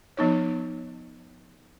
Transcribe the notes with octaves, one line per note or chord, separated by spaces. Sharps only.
F3 B3 D#4 C#5